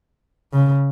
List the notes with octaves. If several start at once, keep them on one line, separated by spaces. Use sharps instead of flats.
C#3